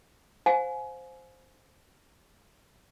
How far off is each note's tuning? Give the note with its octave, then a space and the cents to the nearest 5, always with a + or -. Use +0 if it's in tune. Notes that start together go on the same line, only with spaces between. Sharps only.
C5 +0 F5 +30 G#5 +25